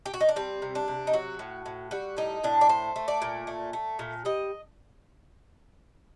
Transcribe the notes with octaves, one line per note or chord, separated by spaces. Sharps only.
G4
F#4
D#4
D4
G3 C4
C3
D4
C3
D#4
F#3 F#4
A2
A2
G3 F#4
A2 D#4
A2 D4
D5
A3 C5
A3
D5
A#2
A3
A3
A#2
G3 D#5